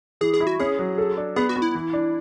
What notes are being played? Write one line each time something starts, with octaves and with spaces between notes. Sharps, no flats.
E3 G#4
G#4
E4
F#4
C#4 G#4
F#3
A4
D4
B3 G#4
F#4
B3
E4
E3
D4